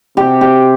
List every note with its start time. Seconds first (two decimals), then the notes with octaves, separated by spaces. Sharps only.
0.17 C3 G4
0.41 G4